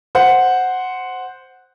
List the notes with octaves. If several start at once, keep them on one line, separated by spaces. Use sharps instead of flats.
C5 F#5